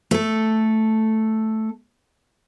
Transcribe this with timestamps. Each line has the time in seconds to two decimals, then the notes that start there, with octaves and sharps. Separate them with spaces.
0.11 A3 A4